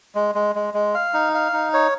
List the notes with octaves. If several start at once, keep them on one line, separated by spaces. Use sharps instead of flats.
G#3
G#3
G#3
G#3
F5
D#4
F5
D#4
C#5